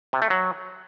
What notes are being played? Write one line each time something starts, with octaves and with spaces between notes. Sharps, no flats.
C3
A3
F#3